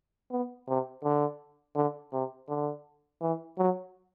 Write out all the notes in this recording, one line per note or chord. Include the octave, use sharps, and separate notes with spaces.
B3
C3
D3
D3
C3
D3
E3
F#3